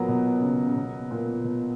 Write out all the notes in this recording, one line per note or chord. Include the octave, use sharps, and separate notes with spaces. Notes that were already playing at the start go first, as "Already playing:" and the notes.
Already playing: A#2 F#3 B3 A#4
B2
C#3
C#3
B2
A#2
B2